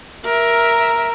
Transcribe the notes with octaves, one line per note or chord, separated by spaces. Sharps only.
A#4 E5